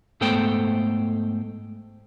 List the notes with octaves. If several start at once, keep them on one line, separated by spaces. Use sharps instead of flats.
G#2 A3 B3 A4 C5 G5